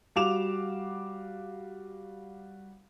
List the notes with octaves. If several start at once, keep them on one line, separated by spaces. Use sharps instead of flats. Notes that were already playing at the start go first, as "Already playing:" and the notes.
G3 F#4 F5 D6 E7 F7